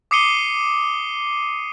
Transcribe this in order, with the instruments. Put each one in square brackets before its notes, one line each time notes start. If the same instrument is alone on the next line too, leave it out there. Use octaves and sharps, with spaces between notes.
[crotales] D6 D#6 C7 C#7 D#7 G7